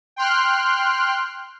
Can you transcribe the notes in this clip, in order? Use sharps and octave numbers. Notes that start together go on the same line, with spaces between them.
G5 C6 F6 F#6